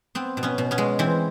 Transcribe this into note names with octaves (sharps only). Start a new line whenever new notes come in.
B3 C4
B2
B3 C#4
B2
B3 C#4
G#3
E3 C4